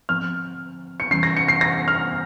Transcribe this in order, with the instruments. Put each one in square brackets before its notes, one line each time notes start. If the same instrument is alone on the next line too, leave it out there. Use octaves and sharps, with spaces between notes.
[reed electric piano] G#2 F3 C4 [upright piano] F6
[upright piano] C#7
[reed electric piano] F2 C3 E3 G3 C#4 [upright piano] C7
[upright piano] A#6
C#7
C7
A#6
F6